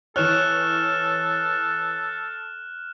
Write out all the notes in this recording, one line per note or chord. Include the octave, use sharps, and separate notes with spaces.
E3 A4 C#5 F6 F#6 E7